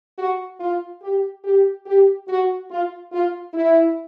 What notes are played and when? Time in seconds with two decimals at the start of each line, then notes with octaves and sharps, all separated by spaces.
0.18 F#4
0.60 F4
1.02 G4
1.45 G4
1.86 G4
2.28 F#4
2.70 F4
3.12 F4
3.54 E4